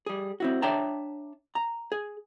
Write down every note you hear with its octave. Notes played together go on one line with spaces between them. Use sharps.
G3 G#4
C4 E4 F#4
D4 C#5 E5 G5 A5 A#5
A#5
G#4